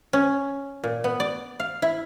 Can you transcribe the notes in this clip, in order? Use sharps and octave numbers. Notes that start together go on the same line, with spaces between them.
C#4
A#2
B3
D5
F5
E4